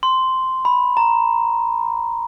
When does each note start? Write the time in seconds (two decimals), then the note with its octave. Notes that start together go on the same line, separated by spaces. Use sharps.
0.03 C6
0.65 B5
0.97 A#5